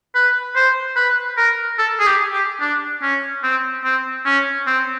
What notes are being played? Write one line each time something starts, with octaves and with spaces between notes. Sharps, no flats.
B4
C5
B4
A#4
A4
G#4
G4
G4
D4
C#4
C4
C4
C#4
C4